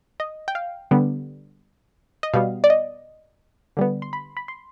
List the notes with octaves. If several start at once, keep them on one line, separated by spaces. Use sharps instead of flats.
D#5
G5
F5
D3 G3 B3
D#5
B2 G3 B3 F5
D5
D#5
D3 G3 B3
C6
B5
B5
C6